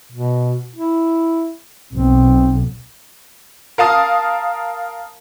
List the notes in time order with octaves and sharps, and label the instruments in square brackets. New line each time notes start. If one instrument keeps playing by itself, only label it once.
[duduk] B2
E4
[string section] B1 [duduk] C4
[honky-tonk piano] A#4 F5 A5 D#6